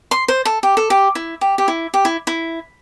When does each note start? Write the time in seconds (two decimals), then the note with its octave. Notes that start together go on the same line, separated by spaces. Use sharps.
0.11 C6
0.28 C5
0.45 A4
0.63 G4
0.77 A4
0.90 G4
1.15 E4
1.41 G4
1.58 G4
1.68 E4
1.94 G4
2.05 E4
2.27 E4